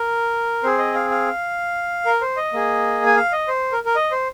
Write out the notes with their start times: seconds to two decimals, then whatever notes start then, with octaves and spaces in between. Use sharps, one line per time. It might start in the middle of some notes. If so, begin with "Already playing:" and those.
Already playing: A#4
0.63 C4 G#4 C5
0.78 D#5
0.94 F5
1.10 F5
2.06 A#4
2.21 C5
2.37 D#5
2.53 A#3 G#4
3.06 G#5
3.16 F5
3.33 D#5
3.48 C5
3.72 A#4
3.86 A#4
3.95 D#5
4.11 C5